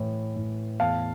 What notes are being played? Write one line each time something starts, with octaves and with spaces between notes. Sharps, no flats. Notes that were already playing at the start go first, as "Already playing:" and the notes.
Already playing: A2 E3
A2
E2 F5 A5